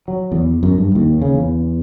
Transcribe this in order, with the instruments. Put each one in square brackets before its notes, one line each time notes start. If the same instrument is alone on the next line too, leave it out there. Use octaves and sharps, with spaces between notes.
[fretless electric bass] F#3
E2
F#2
G2
D#2
C#3
E2